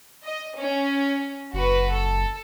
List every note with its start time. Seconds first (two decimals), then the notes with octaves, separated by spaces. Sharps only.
0.24 D#5
0.58 C#4
1.54 F#1 F#4 B4
1.91 A4